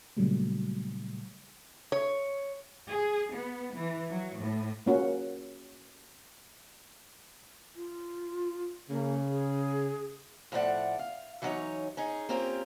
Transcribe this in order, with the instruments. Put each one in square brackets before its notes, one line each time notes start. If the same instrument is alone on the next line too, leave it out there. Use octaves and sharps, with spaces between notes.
[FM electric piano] A#2 C#3 F#3 G3 A3
[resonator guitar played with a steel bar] C#5
[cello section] G#4
B3
E3
F#3
A2
[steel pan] A#3 C#4 F#4
[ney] F4
[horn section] C#3 [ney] A#3
[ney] G#4
[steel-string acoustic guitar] A2 F3 A3 A4 D5 F#5
F5
E3 F#3 G3 C#4 D#4 C#5
C#4 D#4 G#4
A#3 C4 C#4 F4 G4 A#4